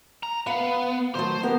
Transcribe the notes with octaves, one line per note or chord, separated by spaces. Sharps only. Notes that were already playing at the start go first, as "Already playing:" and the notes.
A#5
B3 F5
D#3 F#3 A3 C5
A#3 B3 G4 A#4